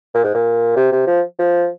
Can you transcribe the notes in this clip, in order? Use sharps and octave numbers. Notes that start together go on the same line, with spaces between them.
A#2
G#2
A#2
C3
C3
F3
F3